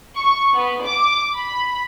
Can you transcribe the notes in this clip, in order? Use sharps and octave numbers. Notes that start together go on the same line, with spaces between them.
C#6
B3
D6
B5